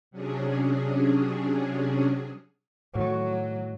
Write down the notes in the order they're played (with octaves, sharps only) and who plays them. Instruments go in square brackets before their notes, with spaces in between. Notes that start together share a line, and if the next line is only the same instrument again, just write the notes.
[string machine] C3 F#3 C#4 D4 G#4
[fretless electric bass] A2 D#3 [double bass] F#3